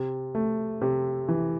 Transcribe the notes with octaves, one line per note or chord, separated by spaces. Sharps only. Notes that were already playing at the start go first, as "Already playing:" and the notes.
Already playing: C3
A3
C3
E3